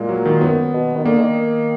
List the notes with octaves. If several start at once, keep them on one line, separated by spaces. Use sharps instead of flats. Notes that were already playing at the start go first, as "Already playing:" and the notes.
Already playing: A#2 G#3 A#3
F#3
D#3
F#2 B3
B2
D#3
D3 A#3
D3
D#3